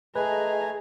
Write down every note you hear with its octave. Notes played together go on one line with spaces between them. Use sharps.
A3 G#4 B4 D#5 G#5 A#5